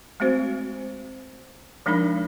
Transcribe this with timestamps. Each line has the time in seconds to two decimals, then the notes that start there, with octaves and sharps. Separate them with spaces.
0.20 G#3 A3 C4 F#4 C5
1.86 F3 G#3 D4 D#4 A#4 B5